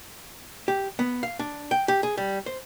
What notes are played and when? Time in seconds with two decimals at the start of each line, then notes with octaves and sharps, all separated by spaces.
0.68 G4
0.99 B3
1.23 F5
1.39 D4
1.71 G5
1.88 G4
2.03 G#4
2.17 G3
2.46 C5